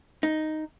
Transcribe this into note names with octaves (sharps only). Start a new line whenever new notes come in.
D#4